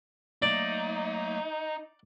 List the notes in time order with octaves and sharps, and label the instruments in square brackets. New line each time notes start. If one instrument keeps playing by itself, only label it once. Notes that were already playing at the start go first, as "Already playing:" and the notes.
[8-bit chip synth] F#3 A3 A#3 [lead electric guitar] D#4 [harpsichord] D5